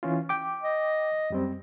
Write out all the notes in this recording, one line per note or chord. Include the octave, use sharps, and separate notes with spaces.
E3 C#4 F4
G5 D6
D#5
F#2 G3 C4